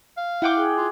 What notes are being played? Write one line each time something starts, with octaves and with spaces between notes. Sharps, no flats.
F5
E4 F#5 G5 D6 F#6
G#4
F4